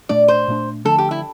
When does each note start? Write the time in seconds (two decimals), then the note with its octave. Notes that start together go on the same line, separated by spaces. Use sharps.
0.09 A#2 A3 D4 D5
0.28 C5
0.48 A#2 A3 D4
0.85 D3 F3 A3 D4 A4
0.98 G4
1.11 E4